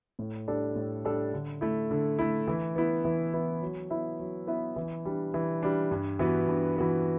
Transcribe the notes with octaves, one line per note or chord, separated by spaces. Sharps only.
A2
G3 D4 A4 D5
A2
G3 D4 A4 D5
D3
A3 E4
D3
A3 E4
E3
B3 E4
E3
B3 E4
F#3
B3 E4 B4 E5
F#3
B3 E4 B4 E5
E3
G3 D4
E3
G3 D4
G2
E3 B3 F#4 B4
G2
E3 B3 F#4 B4